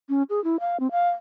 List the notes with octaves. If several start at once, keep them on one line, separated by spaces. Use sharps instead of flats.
C#4
G#4
E4
F5
C4
F5